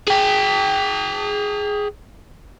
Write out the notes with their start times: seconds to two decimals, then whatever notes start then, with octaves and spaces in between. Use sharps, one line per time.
0.08 G#4 G5